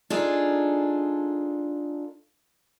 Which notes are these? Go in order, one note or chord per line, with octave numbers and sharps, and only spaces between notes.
D4 D#4 F4 G#4 A4